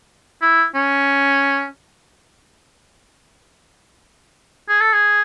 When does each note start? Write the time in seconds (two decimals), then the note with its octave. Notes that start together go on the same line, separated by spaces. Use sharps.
0.42 E4
0.75 C#4
4.69 G#4
4.81 A4
4.93 G#4